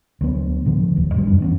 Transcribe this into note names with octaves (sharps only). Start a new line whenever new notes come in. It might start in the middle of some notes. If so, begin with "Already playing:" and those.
D2 F#3 B3
A2 D3 F3
E1 D#2
A1 G#2 F#3 G3
F#2 D4
E3 B3 C#4